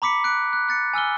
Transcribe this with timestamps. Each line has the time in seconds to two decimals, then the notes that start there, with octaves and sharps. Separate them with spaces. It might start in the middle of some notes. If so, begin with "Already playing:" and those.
0.02 A#5 B5 D6 B6 C#7
0.24 F#6 C#7 D7
0.53 F#6
0.69 F#6 A6 C#7
0.93 G#5 E6 F6 G7